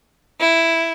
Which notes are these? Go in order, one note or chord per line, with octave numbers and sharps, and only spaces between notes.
E4